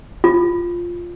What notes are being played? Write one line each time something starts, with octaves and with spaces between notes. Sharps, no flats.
F4